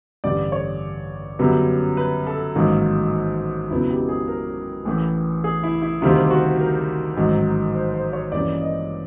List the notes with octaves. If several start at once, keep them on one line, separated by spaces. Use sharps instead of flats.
A1 G2 D3 G3 D5
C#5
F#2 D3 G3 B3
B4
A4
A1 G#2 D#3 F#3 A#3
F2 C#3 F#3 B3 E4
G4
G#4
A#4
A1 A2 E3
G#4
E4
E4
D2 C3 D#3 G3 C4 F4
F#4
A#4
A1 G#2 D#3 F#3
C5
C5
C#5
G2 E3 G3 A#3 C#4 D5
D#5